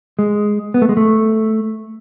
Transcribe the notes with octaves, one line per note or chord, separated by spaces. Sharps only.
G#3
B3
A3
G#3
A3